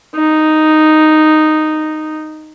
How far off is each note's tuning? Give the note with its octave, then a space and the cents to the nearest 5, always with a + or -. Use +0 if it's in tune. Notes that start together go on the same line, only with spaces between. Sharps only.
D#4 -5